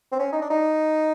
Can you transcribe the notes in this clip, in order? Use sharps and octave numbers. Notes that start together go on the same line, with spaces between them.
C4
C#4
D#4
D4
D#4